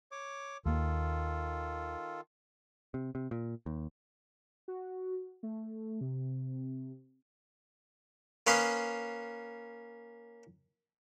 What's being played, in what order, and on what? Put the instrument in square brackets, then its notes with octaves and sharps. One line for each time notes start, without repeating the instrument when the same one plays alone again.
[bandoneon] C#5 D6
[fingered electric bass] D#2 A#3 [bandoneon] D#3 F4 A4
[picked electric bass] C3
C3
A#2
D#2
[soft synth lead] F#4
A3
C3
[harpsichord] A#3 C#4 B4 C#5 C6 D#6